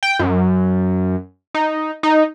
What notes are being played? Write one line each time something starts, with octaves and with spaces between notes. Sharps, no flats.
G5
F#2
D#4
D#4